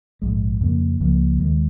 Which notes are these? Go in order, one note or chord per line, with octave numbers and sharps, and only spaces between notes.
A#1 G#2 G#3
F2 C#3 A#3
C#2 C#3 F3 A#3
D#2 D#3 G#3